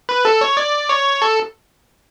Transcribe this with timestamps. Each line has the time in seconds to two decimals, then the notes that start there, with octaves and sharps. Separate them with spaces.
0.09 B4
0.25 A4
0.41 C#5
0.57 D5
0.89 C#5
1.22 A4